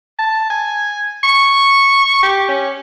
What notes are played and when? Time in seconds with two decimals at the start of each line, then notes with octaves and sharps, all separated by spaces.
0.19 A5
0.50 G#5
1.23 C#6
2.23 G4
2.49 C#4